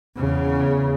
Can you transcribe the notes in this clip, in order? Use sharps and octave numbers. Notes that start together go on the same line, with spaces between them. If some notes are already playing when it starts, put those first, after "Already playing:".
E2 C#3